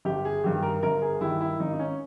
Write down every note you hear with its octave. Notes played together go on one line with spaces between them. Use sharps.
G1 G4
G#4
G2 D#3 G4
A#4
G1 A#4
G#4
G2 D#3 E4
E4
G#1 D#4
D#4
C#4